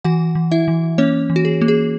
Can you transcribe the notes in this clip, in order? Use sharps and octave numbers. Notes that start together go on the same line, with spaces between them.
E3 F#4 F#5
E3
E4 E5
E3
A#3 C#4 C#5
E3
F#4
G#4
A#3
G#4